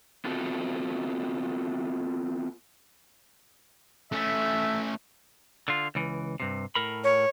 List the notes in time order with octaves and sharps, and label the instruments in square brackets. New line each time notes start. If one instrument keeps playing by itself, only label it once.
[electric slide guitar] B3 C4 F4 F#4 A4
[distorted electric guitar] A3 C#4 [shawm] E5
[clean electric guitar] D3 F4
C#2 E3
G2 C3
A2 A#4 B5
[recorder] C#5